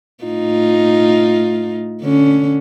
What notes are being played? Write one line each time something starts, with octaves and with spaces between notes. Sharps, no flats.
A2 D#4 F4
D3 C#4